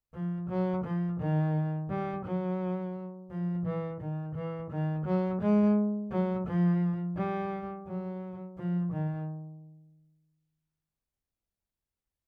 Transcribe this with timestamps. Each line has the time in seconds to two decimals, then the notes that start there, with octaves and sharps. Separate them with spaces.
0.13 F3
0.49 F#3
0.84 F3
1.20 D#3
1.89 G3
2.25 F#3
3.30 F3
3.66 E3
4.01 D#3
4.35 E3
4.71 D#3
5.06 F#3
5.41 G#3
6.11 F#3
6.47 F3
7.17 G3
7.87 F#3
8.58 F3
8.92 D#3